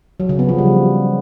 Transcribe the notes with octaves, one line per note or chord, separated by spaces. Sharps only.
F#3
C#3
B3
F3
G3